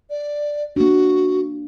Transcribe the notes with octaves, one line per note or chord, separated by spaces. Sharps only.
D5
A#3 D4 F#4